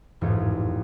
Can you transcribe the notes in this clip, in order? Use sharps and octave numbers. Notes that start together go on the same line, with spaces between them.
E1 A1 F2 G#2